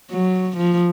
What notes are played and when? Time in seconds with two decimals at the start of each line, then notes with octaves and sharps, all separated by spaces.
0.10 F#3
0.57 F3